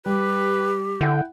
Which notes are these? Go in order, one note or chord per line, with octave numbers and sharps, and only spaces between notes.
G3 G4 B4
D3 E4 F#5 G5